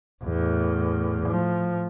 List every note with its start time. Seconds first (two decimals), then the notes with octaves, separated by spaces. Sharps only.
0.23 E2 A2
1.24 A2 F3